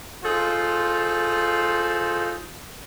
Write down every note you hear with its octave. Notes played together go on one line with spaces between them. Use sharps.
D#4 F4 G#4 A4 C5